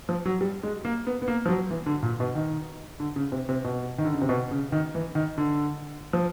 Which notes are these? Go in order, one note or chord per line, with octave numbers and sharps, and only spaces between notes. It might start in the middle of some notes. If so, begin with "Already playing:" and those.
F3
F#3
G3
G#3
A#3
B3
B3
A#3
F3
F#3
E3
D3
A#2
B2
D#3
D3
C#3
C3
C3
B2
D#3
D3
C#3
C3
B2
C#3
D#3
E3
D#3
D3
F3